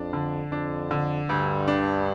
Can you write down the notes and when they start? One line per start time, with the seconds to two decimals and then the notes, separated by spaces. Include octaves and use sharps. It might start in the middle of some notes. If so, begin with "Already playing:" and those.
Already playing: F2 D4
0.13 D3
0.51 F2 D4
0.91 D3
1.29 D2 G2
1.68 D4